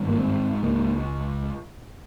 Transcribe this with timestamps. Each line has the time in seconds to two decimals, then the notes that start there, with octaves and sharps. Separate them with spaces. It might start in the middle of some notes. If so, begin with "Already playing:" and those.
Already playing: G#1 G2
0.09 A#3
0.19 G#2 C4
0.62 C#2 A#3